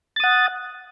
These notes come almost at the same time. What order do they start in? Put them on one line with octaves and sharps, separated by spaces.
A6 D#6 F#5